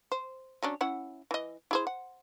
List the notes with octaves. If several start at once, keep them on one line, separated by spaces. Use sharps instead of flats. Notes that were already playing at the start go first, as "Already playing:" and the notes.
C5
F#3 C#4 D4
C#4 E4 F#5
E3 D#5
E4 G#4 C5
F#5